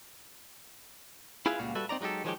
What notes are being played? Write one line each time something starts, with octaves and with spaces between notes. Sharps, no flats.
E4 F4 G#4 B4 E5 F5
C#2 A#2 G3 F#4 F5
G3 F#4 A4 B4 E5
C4 D#4 D5 A#5
F#3 G#3 D#4 G4 A4
D#3 F3 F#3 G#3 F#4 G4